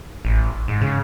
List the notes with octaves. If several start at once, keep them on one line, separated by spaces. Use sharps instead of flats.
A1
G#2
C#3